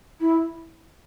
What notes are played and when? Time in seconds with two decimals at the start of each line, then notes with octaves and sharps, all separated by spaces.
0.20 E4